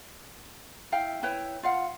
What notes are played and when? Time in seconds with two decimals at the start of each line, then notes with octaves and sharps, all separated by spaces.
0.92 E4 F5 G5
1.23 E4 B4 C#5 G5
1.63 F4 F5 F#5